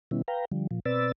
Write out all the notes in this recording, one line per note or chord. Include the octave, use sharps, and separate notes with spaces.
B2 D#3 G3 B3 C#4 E4
B4 F5 G5 A#5
D3 F3 G3
A#2 F3
B2 C4 B4 D5 E6 A6